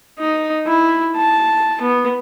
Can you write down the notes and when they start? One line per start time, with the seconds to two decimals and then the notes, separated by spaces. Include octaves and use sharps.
0.18 D#4
0.66 E4
1.16 A5
1.81 B3